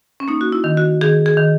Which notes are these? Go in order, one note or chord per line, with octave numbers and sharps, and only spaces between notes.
C#4
A#3 D#4
F#4
E4
D#3
F#4
D#3 G#4
G#4
D#3